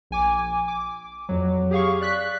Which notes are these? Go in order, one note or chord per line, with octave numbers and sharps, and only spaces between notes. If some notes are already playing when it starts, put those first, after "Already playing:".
A#1 G#5 D6
D6
F2 F#3
G4 G#4 F5 C#6
D5 F#6 B6